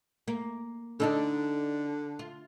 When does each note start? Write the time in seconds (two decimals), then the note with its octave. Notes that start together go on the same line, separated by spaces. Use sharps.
0.28 A#3
1.00 D3 D4 D#4 A4
2.19 F4